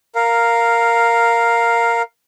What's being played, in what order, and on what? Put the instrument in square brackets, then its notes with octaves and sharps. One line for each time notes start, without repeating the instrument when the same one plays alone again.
[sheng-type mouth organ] A#4 F5